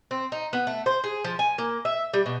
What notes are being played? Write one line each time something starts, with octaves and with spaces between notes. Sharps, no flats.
C4
D#4
B3
A3
C5
G#4
F3
G#5
A#3
E5
G3
B2